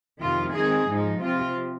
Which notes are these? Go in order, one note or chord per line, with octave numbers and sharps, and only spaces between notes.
F2 C3 D#3 F4
D#3 G#3 C4 D#4 G#4
G#2 F3 G#3 D#4
C3 F3 C4 F4